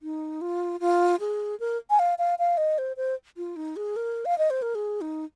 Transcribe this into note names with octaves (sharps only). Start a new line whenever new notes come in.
D#4
F4
F4
G#4
A#4
G#5
F5
F5
F5
D#5
C5
C5
F4
D#4
G#4
A#4
F5
D#5
C5
A#4
G#4
D#4